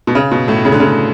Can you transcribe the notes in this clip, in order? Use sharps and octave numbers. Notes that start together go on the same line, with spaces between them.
B2
C#3
B2
A2
C#3
D3
C#3